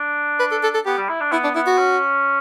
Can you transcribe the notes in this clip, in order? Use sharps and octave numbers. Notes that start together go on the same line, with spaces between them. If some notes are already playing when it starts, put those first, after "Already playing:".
Already playing: D4
B4
A4
A4
A4
B3 G4
G3
E4
D4
B3 E4
D4
B3 E4
F#4
C#4